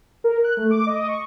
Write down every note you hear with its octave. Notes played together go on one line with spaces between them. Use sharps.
A#4
F#6
A3
D6
D#5
C#6